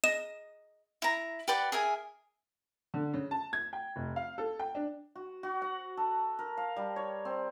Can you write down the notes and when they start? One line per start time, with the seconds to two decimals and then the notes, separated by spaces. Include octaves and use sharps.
0.04 D#5 E7
1.02 E4 A#5
1.48 G4 B4 D5 F#5
1.72 G#4 A#4 E5 G#5
2.94 D3
3.14 C#3
3.31 A5
3.53 G#6
3.73 G5
3.96 F1
4.16 F5
4.38 A4
4.59 G5
4.75 D4
5.15 F#4
5.43 F#4
5.62 F#5
5.97 A4
6.39 A#4
6.57 F5
6.76 G3
6.96 C#5
7.25 C4